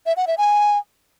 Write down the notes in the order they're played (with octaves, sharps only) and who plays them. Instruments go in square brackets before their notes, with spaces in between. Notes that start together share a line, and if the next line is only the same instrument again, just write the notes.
[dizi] E5
F#5
E5
G#5